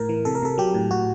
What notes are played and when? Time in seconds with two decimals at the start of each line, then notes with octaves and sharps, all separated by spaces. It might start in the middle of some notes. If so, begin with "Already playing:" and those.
Already playing: A2 A#4
0.09 E3
0.25 C3 A4
0.35 A#4
0.42 C3 A4
0.58 F#3 G4
0.74 A2
0.91 A2 F#4